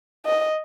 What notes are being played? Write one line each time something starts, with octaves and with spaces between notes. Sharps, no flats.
D#5